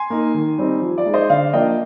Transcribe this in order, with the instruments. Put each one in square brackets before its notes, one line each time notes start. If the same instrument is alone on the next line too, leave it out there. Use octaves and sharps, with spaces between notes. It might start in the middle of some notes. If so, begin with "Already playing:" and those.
Already playing: [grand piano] G#5 C6
A#3 D#4
D#3
G3 C4 D#4
F3
D5
G#3 D#4
C5 D#5
D3 D5 F5
F3 A#3 D4 D#5 G5